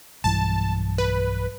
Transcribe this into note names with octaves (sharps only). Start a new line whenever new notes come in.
B1 G2 E3 A5
B4